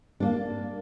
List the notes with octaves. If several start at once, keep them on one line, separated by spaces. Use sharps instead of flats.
A#3 D4